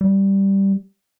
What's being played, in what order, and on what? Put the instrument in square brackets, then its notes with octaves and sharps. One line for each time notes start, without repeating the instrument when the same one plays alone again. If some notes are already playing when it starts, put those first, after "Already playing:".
[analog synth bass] G3